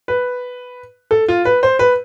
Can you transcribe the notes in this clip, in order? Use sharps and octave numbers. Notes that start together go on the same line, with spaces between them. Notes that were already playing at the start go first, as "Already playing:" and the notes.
B4
A4
F4
B4
C5
B4